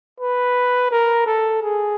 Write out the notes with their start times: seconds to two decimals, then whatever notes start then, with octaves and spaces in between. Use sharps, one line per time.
0.21 B4
0.91 A#4
1.26 A4
1.62 G#4